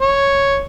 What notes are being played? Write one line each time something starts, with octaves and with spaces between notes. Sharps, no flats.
C#5